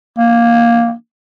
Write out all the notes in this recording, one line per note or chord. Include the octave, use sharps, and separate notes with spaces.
A#3